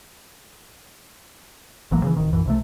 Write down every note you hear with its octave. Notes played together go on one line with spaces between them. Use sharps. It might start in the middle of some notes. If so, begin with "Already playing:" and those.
A1 E3 F#3 A#3
C#3 E3
D1 D#3
B1 F#2 E3
C2 C3 A3